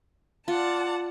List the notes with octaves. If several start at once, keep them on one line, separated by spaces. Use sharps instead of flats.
F4 D5 F#5 A5